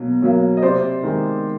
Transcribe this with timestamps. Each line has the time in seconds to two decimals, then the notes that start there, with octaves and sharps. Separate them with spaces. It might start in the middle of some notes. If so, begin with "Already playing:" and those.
Already playing: B2 F#3 A#3
0.22 F#3 A#3
0.57 D#5
0.62 C3 C5 D5
1.03 D#3 G#3